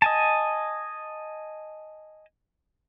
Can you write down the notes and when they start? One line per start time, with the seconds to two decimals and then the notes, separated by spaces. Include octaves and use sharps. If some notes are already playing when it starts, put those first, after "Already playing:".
0.02 D#5 G#5 A5